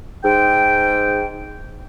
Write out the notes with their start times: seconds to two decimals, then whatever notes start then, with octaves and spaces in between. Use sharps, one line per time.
0.24 G#2 G5